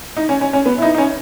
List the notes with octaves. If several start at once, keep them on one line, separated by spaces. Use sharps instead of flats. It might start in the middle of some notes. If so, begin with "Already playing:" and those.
D#4
C#4
C#4
C#4
B3
E4
D#4
D#4
C#4